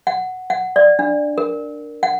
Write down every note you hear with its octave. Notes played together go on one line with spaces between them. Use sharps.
F#5
F#5
D5
D4
A#4
F#5